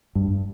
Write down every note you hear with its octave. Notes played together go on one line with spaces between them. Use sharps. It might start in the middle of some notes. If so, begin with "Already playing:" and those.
G2